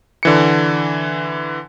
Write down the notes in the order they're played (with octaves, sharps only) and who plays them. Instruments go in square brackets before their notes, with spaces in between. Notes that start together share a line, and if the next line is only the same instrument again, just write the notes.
[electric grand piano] D3 E3 C#7